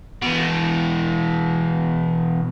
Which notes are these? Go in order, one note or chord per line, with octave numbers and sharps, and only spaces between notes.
B2 E3